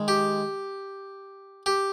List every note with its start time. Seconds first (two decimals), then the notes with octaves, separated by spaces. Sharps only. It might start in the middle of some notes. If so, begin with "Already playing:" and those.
Already playing: D#3 G#3
0.08 G4
1.66 G4